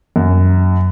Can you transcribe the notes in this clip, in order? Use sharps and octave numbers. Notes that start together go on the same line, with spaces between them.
F#2